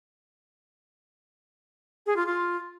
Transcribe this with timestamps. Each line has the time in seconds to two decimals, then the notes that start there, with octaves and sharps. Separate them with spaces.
2.06 G#4
2.17 F4
2.27 F4